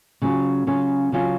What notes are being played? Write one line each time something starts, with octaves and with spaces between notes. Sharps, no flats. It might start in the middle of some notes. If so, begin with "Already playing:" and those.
C#3 F#3 C#4 F4
C#3 F#3 C#4 F4
C#3 F#3 C#4 F4